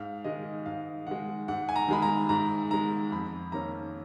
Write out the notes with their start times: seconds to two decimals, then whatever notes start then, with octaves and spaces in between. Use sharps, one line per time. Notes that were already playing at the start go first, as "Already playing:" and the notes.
Already playing: G#2 F5
0.24 D#3 G#3 D#5
0.66 G#2 F5
1.07 D#3 G#3 F#5
1.48 G#2 F#5
1.69 G#5
1.76 A#5
1.88 D#3 G#3 B5
2.02 A#5
2.29 G#2 A#5
2.70 D#3 G#3 A#5
3.12 F2 B5
3.52 D#3 A#3 C#4 A#5